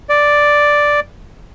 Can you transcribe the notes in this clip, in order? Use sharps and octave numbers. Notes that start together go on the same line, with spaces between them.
D5